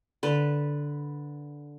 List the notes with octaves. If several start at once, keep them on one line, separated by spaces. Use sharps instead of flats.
D3 B4